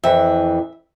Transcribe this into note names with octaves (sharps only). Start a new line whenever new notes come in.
F2 E3 E5